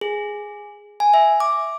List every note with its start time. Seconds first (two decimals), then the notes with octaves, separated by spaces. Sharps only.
0.01 G#4
1.00 G#5
1.14 E5
1.40 D6